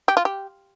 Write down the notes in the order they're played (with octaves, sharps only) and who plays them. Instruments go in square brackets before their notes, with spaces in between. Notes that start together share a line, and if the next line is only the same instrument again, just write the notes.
[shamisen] G4
F4
G4